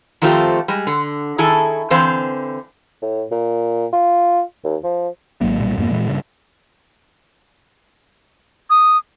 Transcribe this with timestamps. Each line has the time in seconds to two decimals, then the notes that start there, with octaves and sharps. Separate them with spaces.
0.22 D#3 F3 A3 C4 F4 G4
0.68 G3 G#3
0.87 D3
1.38 D#3 E4 G#4 A4
1.90 D3 E3 C4 C5 F5
3.02 A2
3.31 A#2
3.93 F4
4.64 D#2
4.84 F3
5.41 G#1 G#2 F#3 A#3
5.59 B1 A#2 G3
5.78 F2 G#2 G#3 A#3
5.91 A#2 E3 G#3
6.08 G2 C#3
8.70 D#6